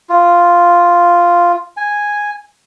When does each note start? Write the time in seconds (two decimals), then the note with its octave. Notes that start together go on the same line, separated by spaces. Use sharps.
0.09 F4
1.77 G#5